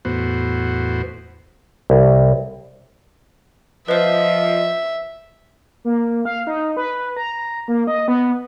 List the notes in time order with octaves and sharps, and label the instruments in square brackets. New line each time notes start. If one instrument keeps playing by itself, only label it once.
[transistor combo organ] E2 A2 B3 F#4 C5
[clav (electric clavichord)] C2
[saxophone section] F3 [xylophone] B4 C5 [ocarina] D#5 [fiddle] E5
[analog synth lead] A#3
F5
D#4
B4
A#5
A#3
D#5
B3